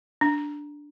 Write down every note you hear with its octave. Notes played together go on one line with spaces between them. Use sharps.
D4